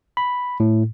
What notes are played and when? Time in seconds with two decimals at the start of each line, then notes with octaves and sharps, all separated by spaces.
0.17 B5
0.60 A2